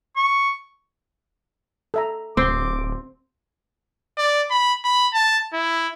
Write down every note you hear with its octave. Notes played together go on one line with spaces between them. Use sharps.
C#6
A4 E5 A#5
D1 C4 C6 D6
D5
B5
B5
A5
E4